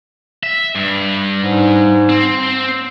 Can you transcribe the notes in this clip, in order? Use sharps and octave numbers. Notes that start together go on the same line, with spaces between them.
E5
G2
G#2
C4